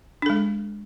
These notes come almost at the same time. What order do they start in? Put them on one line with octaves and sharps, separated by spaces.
D4 A4 G#3